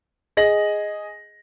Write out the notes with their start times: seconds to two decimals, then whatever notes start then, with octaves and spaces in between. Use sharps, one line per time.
0.37 G#4 D#5 A#6 F#7